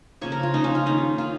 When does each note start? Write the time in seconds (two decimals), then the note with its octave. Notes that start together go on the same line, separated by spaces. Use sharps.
0.21 C#3 F3 A#3 C#5
0.32 A#4
0.43 F4
0.54 C#3 F3 A#3 D#4
0.64 C#4
0.75 F4
0.86 D#3 A#3 D#4
1.18 D#3 A#3 F4